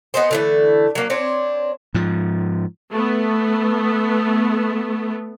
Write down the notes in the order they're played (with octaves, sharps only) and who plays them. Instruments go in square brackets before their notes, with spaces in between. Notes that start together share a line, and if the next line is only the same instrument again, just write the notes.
[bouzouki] B3 D#4 G#4 C5
D3 E3 A3
F#3 A#3
C4 D4 C#5
[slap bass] G#2 F3
[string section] A3 B3